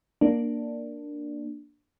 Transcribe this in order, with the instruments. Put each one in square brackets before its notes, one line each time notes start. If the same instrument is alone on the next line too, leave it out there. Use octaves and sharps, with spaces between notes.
[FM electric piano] A#3 D4